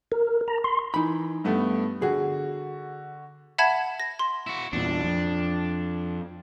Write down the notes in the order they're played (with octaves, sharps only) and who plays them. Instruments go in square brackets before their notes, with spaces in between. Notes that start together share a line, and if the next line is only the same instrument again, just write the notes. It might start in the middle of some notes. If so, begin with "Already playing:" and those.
[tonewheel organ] A#4
A#5
C6
[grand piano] E3 [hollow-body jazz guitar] D#4 B5
[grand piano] G2 A3 B3
[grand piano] D3 F#4 [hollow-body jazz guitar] G#4
[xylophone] E5 F#5 A5 B5 G#6 E7
A#6
C6
[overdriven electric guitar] E4 F#4
[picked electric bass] E2 A#2 [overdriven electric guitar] D4
[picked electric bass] F2